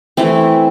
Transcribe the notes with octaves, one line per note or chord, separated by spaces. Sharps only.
E3 A3 C4 E4